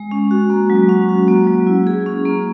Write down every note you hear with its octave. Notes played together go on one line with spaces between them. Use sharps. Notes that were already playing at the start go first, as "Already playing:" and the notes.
Already playing: G#3
C#4
F#4
A#3
F#3
C#4
F#4
A#3
F#3
E4
G#4
C#4
A#3